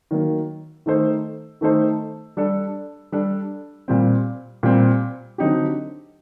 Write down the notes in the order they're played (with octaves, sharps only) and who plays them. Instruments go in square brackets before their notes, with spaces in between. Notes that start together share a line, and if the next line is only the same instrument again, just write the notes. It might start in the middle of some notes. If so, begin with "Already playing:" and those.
[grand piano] D#3 F#3 A#3
D#3 A3 D#4 A4 C5
D#3 A3 D#4 A4 C5
G3 D4 A4
G3 D4 A4
A#2 G3 C4
A#2 G3 C4
D3 F#3 C4 D#4 G4